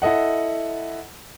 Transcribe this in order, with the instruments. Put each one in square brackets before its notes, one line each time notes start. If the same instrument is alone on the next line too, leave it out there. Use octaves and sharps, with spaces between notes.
[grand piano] E4 A4 D#5 F#5